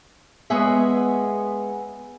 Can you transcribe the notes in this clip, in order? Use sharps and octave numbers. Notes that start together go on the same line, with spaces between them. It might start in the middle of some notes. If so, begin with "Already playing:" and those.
G#3 B3 G#4 C#5 E5